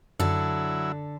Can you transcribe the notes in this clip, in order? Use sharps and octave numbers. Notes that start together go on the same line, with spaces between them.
F#2 D3 F#3 E4 A4